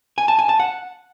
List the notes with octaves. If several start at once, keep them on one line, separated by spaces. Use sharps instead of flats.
G#5
A5
G#5
A5
F#5